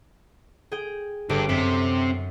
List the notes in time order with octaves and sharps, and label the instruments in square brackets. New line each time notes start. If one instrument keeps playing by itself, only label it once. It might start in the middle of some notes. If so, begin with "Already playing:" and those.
[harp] G#4 G5
[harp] G1 D6 D7 [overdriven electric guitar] G2
[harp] F#2 [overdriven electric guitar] C3